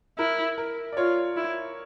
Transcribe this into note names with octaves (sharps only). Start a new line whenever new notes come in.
E4 A#4
A#4
D5
F4 C#5
E4